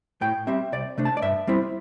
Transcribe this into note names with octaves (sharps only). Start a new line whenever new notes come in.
A2 G5
G3 C4 E5
C2 D5
C3 A3 D4
A5
D5
G2 E5
G3 C4 E4